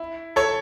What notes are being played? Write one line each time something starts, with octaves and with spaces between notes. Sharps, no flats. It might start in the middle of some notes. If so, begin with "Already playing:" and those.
Already playing: E4
A4 C#5